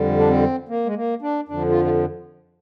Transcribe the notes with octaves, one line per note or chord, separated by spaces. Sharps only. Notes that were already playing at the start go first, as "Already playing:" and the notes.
Already playing: F2 D3 G3
D4
C4
A#3
G#3
A#3
D4
F2 D3 F3 D4
F4
F4